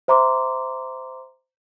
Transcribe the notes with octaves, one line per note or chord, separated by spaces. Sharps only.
C5 E5 A#5 C6 D6